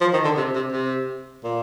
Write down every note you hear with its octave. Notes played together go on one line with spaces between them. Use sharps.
F3
D#3
D3
C3
C3
C3
A#2